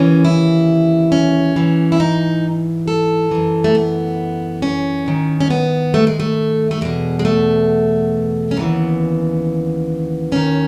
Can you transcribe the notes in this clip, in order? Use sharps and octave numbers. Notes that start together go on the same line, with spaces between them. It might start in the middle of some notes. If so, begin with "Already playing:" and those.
Already playing: D#2 C#3 E3 C#4
E4
C#4
G#2 E3
E4
D#4
A4
F#2 E3
A3
B3
C#4
G#2 D#3
C#4
B3
A3
G#3
A3
A3
E2 B2 G#3
G#3
A3
C#4
D#2 C#3 E3 B3
D#2 D#3 C#4